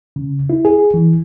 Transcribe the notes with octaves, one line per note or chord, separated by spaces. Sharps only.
C#3
E4
G#4
E3